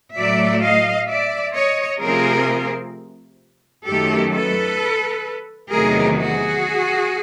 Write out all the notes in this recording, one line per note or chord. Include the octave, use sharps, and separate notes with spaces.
A2 F#3 A3 D5 E5
D#5 F5
D5 E5
C#5 D#5
C3 F3 A3 C4 F4 G#4 A#4
F#2 D#3 F#3 A3 G4 A4
A4 B4
E2 C3 D#3 F#3 A3 G#4 A#4
F#4 G#4